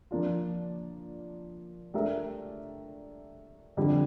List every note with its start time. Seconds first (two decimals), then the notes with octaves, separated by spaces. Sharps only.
0.11 F3 A#3 D4 F4
1.94 A3 D4 G4 A#4 E5
3.77 F2 D3 G3